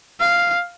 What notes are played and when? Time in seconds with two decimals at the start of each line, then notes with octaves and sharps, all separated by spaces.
0.20 F5